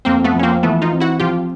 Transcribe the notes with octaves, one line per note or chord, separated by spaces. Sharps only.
F2 A#3 C4
A3 B3
F3
C#4
A#3 C4
E3 A3 B3
D#4 F4
C4
E4 F#4
F3 F4 G4